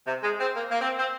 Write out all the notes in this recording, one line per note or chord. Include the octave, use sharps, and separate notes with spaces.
C3
G#3
C4
A#3
A#3
C4
C4